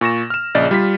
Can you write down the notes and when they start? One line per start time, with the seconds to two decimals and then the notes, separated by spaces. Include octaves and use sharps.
0.01 A#2 C#6 A#6 E7
0.30 F6 E7
0.55 A#1 C#3 D5 D#5 A6
0.71 G3 F4 B6